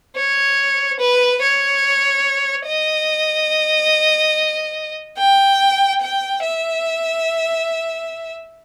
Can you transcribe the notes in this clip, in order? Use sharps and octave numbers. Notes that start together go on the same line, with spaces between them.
C#5
B4
C#5
D#5
G5
G5
E5